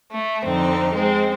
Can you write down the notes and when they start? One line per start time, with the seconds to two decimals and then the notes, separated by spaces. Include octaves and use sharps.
0.11 A3
0.44 F2 D3 C4 D#4
0.93 G#3 C4